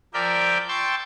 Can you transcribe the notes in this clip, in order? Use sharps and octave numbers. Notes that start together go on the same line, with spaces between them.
F3 A#4 D5 E5 G5 G6
G5 A5 C6 C#6 E6 G6